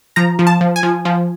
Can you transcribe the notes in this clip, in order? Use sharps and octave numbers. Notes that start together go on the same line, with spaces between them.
F3 A#5
F3
A5
F3
G#5
F3
F3